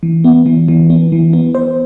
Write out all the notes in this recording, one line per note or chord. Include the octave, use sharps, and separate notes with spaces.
E3
B3
E3
E3
B3
E3
B3
C5